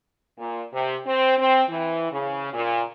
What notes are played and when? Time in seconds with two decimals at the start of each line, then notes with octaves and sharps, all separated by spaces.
0.39 A#2
0.74 C3
1.06 C4
1.38 C4
1.68 E3
2.12 C#3
2.53 A#2